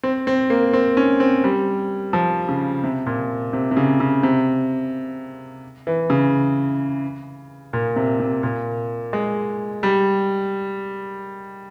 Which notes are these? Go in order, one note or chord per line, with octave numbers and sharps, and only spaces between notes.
C4
C4
A#3
C4
C#4
C4
G3
F3
C#3
C3
A#2
C3
C3
C#3
C#3
C3
E3
C#3
A#2
C3
C3
A#2
G#3
G3